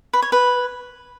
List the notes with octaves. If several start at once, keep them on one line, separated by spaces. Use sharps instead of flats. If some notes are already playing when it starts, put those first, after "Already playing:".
B4
C#5
B4